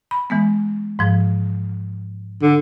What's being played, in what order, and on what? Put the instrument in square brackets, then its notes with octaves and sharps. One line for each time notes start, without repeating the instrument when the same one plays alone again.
[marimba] B5
E3 G#3 B3
G#2 F3
[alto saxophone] D3